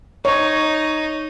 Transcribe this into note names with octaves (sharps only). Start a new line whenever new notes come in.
D#4 C#5